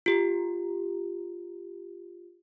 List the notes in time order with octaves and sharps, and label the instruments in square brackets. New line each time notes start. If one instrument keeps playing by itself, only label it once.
[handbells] F4 G4